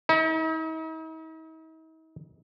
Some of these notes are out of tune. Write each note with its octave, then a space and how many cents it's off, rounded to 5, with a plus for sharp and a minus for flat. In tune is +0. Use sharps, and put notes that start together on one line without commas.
D#4 +45